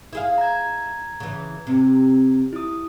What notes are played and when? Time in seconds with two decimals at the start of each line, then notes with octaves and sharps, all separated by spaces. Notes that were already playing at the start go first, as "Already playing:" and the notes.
0.13 E4 G#4 F5
0.38 A#5 G#6
1.20 C#3 E3
1.67 C3 C4
2.53 E4 D#6